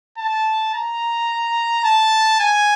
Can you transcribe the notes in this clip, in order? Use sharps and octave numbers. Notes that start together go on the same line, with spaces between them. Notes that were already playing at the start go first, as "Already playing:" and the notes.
A5
A#5
A5
G#5